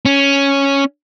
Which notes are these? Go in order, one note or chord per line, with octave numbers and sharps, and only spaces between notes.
C#4